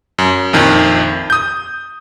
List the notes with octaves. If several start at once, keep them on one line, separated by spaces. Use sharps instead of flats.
F#2
A#1 F2 D#3
D#6 G6